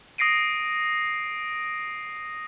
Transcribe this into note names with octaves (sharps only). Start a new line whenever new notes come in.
D#6 A#6 C7 D7 D#7